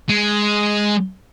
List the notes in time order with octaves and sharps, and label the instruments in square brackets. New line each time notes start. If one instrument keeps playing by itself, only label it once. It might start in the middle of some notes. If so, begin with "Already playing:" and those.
[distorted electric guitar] G#3